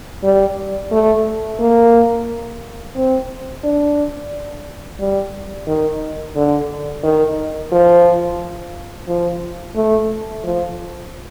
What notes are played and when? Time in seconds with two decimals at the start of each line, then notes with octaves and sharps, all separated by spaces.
0.23 G3
0.92 A3
1.59 A#3
2.96 C4
3.64 D4
5.00 G3
5.67 D#3
6.36 D3
7.03 D#3
7.72 F3
9.08 F3
9.76 A3
10.44 F3